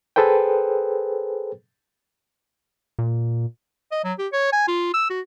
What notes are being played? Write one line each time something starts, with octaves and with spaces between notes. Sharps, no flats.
G#4 A4 B4 C5 G5
A#2
D#5
F#3
G4
C#5
G#5
F4
E6
F#4